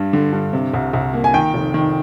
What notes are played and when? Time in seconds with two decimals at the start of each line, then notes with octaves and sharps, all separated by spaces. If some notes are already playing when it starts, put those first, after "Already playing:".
Already playing: G2 G3
0.13 D3
0.33 G2
0.53 C3
0.74 C2
0.93 C2
1.14 A#3
1.24 G#5
1.34 D#3 G5
1.54 F1
1.74 D#3